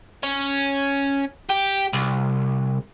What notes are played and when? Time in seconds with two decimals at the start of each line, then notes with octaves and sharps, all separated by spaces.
0.23 C#4
1.49 G4
1.93 C2